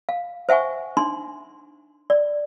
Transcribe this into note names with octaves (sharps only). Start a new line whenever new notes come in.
F5
C5 E5 F#5 G#5 C#6
D4 D#4 C6
D5